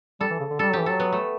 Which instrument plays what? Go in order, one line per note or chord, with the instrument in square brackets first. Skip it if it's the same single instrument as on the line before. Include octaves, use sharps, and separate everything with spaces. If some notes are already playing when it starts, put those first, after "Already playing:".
[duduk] G3 [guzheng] A4
[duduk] E3
C#3
D3
[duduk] G3 [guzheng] A4
[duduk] F#3 [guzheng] G4
[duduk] E3
[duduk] F#3 [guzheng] A4
[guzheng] B3
A3